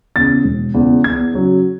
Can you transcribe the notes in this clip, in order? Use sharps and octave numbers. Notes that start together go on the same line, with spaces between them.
E2 C#3 A6
E1
E2 C#3
E2 G#6
C#3 F#3